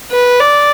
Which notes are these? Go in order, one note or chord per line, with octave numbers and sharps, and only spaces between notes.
B4
D5